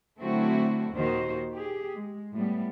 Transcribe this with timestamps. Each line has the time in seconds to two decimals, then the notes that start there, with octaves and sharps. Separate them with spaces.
0.20 D3 F#3 A3 C4 E4 F#4
0.93 D#2 A#2 D#3 F#4 C5
1.53 G4 G#4
1.94 G#3
2.34 A2 G3 B3